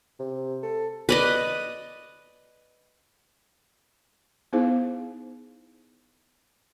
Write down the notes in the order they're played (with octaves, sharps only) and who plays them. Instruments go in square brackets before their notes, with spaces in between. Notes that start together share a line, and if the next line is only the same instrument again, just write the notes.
[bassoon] C3
A4
[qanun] B4 D5 D#5
[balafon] B3 D#4 E4 G#4 C5 F5